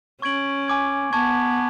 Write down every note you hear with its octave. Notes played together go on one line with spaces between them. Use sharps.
C#4 C#6 G#6 D7 F#7
G#5 D6 G#6
B3 A5 C#6 G#6